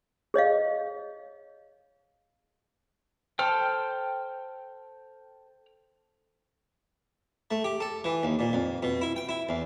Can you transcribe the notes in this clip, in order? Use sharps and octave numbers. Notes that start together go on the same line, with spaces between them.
G#4 C#5 D#5 F5
A4 C5 G5 F6
A3
G4
A4
E3
D#2
A#2
F2
B2
E4
G5
E4
E2